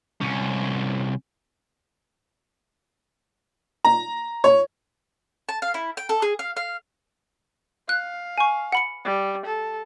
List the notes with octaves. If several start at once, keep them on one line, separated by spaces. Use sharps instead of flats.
C2 C#4
A#5
C#5
A5
F5
E4
G5
A4
G#4
F5
F5
F5 F#6
G#5 C#6
F#5 B5 C#7
G3
A4